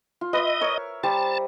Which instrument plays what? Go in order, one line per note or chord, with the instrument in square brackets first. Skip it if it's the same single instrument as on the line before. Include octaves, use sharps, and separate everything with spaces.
[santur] F4
[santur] B4 E5 [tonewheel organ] D#5
[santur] A#4 C#5
[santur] G3 C5 A#5 [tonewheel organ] A5